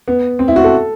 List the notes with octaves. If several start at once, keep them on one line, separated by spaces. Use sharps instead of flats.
B3
C4
E4
F#4
A4